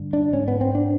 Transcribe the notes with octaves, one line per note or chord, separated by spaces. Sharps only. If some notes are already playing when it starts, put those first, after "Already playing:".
Already playing: G2 D3
D4
G#2 C#4
B3
C4
D4